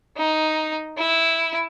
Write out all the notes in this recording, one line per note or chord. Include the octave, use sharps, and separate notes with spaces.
D#4
E4